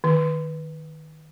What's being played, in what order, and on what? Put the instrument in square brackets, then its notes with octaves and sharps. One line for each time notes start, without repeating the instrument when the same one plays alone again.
[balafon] D#3